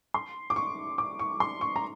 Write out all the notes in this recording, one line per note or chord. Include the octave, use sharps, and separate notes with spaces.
C6
D6
C#6
D6
C#6
C6
C#6
A#5